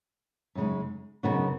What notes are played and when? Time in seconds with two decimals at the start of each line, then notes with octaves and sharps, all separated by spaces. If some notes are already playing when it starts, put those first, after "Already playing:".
0.55 F#2 C#3 G#3 D#4
1.23 F#2 C#3 B3 D#4 F#4